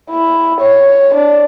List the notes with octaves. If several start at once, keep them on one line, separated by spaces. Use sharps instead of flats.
E4
C#5
D4